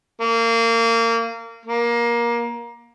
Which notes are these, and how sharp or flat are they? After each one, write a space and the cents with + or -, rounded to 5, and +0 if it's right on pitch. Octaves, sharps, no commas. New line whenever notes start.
A#3 -25
A#3 +20